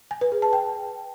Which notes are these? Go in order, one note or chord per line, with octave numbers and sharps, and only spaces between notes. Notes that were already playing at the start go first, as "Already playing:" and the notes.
G#5
B4
G#4
A5
G5